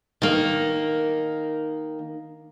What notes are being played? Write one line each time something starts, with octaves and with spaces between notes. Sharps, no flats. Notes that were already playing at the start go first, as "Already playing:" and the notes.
D#3 A#3